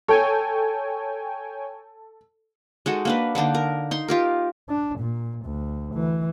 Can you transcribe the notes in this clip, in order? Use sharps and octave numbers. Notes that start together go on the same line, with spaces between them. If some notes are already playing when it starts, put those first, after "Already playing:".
A4 C#5 G5 G#5
G#3 D#4 F#4 A4
A#3 D4 B4
D3 A#3 D4 D#4
A#4
D#4 C6
F4 G4 A#4
D4
A#2
D2
E3